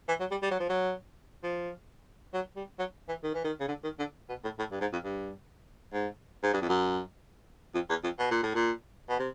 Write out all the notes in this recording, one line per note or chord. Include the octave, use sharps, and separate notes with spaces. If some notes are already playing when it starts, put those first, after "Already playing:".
E3
F#3
G3
G3
F#3
F3
F#3
F3
F#3
G3
F#3
E3
D#3
E3
D#3
C#3
D3
D#3
D3
B2
A2
A2
G2
G#2
F2
G2
G#2
G#2
G2
F2
F#2
F2
E2
F2
B2
A#2
A2
A#2
B2
C3